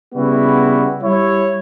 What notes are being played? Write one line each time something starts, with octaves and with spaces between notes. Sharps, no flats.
C#3 G3 B3 E4 F#4
G3 E4 C#5